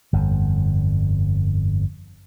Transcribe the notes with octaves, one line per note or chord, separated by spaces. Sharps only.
G1 F2